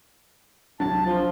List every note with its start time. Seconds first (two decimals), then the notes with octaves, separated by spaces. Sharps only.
0.80 C2 F#3 D4 A5
1.05 F3